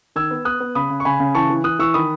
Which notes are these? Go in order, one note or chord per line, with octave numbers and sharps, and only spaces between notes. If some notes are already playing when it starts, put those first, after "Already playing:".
D#3 E6 G#6
B3
B3 D#6 F#6
B3
C#3 B5 D#6
C#3
C#6
C#3 G#5 B5
C#3
E3 A5 C#6
E3
E3 D#6 F#6
E3 C#6 E6
D#3 B5 D#6